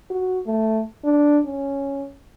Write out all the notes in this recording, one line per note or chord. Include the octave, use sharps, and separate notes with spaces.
F#4
A3
D4
C#4